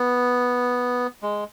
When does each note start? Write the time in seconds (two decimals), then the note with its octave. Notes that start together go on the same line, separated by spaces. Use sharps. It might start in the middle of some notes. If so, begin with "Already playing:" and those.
Already playing: B3
1.22 G#3